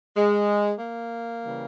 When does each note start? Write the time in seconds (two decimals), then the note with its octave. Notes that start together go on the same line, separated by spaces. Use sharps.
0.16 G#3
0.79 A#3
1.42 C#3 E3 G3